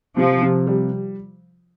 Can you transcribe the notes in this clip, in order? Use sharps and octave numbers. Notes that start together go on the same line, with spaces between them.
C3 F3
C3
G3